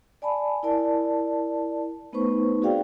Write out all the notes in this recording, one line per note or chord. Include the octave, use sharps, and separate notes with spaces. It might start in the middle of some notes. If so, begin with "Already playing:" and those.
D5 G#5 A5 B5
E4 A#4 D5 A5
A3 B3 D#4 B4 C5 C#6
C4 F#4 G#4 D5 F5 G5